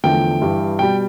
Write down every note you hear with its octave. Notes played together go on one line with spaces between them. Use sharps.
E2 D3 F3 A3 G5
G2 E3 G3
B2 G3 G5